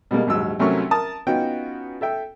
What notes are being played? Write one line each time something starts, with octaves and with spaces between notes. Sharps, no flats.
B2 G3 G#3 A#3
A#1 D#2 G#2 F#3 E6
C2 F#3 A3 C#4 A#4 C#6
A#4 A5 D#6
B3 C#4 D#4 F4 F#4 G5
A4 E5 G5